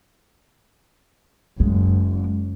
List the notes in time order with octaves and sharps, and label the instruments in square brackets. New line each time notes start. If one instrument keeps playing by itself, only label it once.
[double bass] F#1 [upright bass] G#3